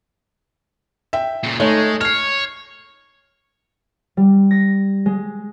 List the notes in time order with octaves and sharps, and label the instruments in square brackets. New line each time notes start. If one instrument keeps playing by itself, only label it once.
[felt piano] E5 G5
[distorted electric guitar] A#2 C#3
[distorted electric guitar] G#3 [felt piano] A3 D#4 C#5
[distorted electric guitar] C#5 [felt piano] F6 C7
[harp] G3
A#6
G#3